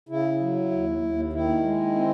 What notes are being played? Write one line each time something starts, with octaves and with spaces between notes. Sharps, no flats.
C#3 E4
F#3
D#2
D#2
D#3 E4
G#3
C4